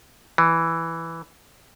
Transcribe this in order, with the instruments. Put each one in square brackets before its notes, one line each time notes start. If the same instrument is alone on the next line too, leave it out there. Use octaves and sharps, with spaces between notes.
[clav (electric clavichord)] E3